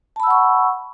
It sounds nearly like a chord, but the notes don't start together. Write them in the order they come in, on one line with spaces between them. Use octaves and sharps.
A5 B5 E6 F#5 C#6